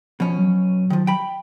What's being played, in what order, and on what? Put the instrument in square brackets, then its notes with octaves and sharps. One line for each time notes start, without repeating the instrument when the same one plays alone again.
[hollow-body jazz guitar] B2 C#4 [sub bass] F3
[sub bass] F#3
[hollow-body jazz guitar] D#3 F3
G5 B5